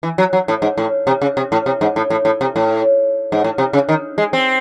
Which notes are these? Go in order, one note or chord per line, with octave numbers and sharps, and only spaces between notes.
E3
F#3
F#3
A2
G#2
A2
C3
C#3
C3
A2
C3
G#2
A2
A2
A2
C3
A2
G#2
A2
C3
C#3
D#3
G#3
C4